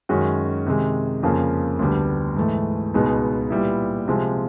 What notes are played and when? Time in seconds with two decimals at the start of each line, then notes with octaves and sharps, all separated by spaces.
0.09 F#2 D#3 G#3 C#4 F#4
0.66 C3 D#3 G#3
1.23 F2 C#3 F3 A#3
1.79 D2 D3 G3 B3
2.36 G#2 E3 A3
2.94 C#2 B2 G#3 B3 D#4
3.50 A#2 G3 B3 E4
4.08 C3 F3 G#3 C4